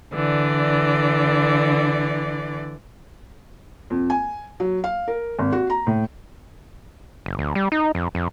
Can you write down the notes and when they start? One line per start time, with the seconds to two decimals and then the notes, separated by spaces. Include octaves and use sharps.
0.13 D3 E3 D5
3.90 F2
4.10 G#5
4.60 F#3
4.84 F5
5.08 A#4
5.39 G#1
5.52 F#4
5.70 A#5
5.87 A2
7.26 F#1
7.39 D2
7.55 G3
7.72 D#4
7.95 F2
8.15 F2